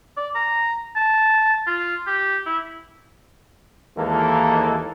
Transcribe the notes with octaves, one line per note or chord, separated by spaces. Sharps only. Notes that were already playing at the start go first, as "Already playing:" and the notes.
D5
A#5
A5
F4
G4
E4
D#2 E3 G#3 A#3 A4 A#4